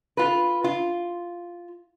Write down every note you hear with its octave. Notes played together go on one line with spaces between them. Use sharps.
F4 B4
F4